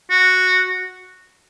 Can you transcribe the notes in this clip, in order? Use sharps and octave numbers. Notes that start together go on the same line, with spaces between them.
F#4